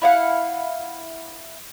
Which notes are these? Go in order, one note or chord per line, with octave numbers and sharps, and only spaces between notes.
E4 F5 F#5